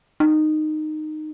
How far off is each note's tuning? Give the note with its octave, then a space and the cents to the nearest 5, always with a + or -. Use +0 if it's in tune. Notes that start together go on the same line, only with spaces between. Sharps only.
D#4 -15